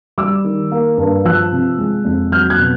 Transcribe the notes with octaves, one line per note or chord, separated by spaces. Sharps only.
G3 D6 E6
D#3
A#3
G2
F3 E6 F#6
C3
G#3
F2
F#3 F6 G6
F#6 G#6
B2